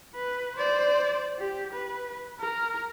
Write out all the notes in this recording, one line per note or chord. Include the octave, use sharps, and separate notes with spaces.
B4
C5 D5
G4
B4
A#4